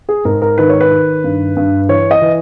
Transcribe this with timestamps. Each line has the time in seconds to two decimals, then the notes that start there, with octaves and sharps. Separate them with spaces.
0.09 G#4
0.25 G#2 A#4
0.42 A#4
0.58 D#3 B4
0.69 C#5
0.81 B4
0.91 D#3
1.24 G2
1.57 G2
1.89 E3 C#5
2.11 D#5
2.22 E3